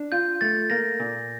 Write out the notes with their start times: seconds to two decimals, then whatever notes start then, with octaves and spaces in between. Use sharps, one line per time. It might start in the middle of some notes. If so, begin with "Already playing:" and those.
Already playing: D4
0.12 F4 G6
0.41 A3 A6
0.70 A#3 A#6
1.00 A#2